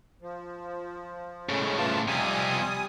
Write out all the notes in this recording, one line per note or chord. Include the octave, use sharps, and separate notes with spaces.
F3
A2 C#3 G#3 A3 C#4
E3 F4 A5
F2 C3 G3 G#5 D#6